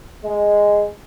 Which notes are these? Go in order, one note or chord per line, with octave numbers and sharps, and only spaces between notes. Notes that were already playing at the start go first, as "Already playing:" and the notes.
G#3